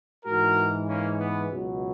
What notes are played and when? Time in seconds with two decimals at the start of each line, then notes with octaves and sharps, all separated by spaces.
0.25 G#2 E3 G#3 F#4 A#4
0.87 A#3 C#4
1.18 B3
1.49 C#2 B2 F#3